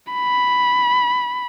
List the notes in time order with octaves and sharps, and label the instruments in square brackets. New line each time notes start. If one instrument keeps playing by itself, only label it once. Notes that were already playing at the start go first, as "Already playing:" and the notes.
[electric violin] B5